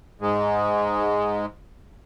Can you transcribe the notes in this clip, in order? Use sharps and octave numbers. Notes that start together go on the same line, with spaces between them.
G#2 G#3